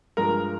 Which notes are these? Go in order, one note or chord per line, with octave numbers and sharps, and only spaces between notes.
G2 F3 G#3 A#4